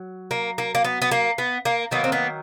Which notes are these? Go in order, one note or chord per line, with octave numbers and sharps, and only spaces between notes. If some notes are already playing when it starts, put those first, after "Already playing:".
Already playing: F#3
A#3
A#3
A#3
B3
B3
A#3
B3
A#3
D#3 F#3 A#3 B3
C4
B3